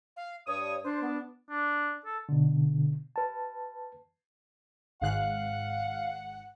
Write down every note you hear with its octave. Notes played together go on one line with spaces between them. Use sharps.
F5
G2 C#5 D#6
D4 C5
B3
D4
A4
B2 D3
B4 A5
G#1 G#2 F5 F#5 F#6